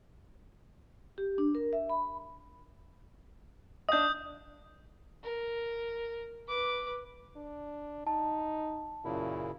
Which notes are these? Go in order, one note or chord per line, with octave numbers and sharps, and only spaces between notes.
G4
D4
A#4
E5
B5
D4 D#5 D#6 G6
A#4
B4 D6
D4
D#4 A5
F#2 A#2 C#3 E4